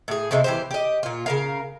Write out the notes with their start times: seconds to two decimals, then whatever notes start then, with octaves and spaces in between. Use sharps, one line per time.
0.08 A2 G#4
0.31 C3 G#3 A3 C4
0.44 E3 G4 C5
0.71 G4 D#5
1.03 A#2 F4
1.26 C#3 A#4 F5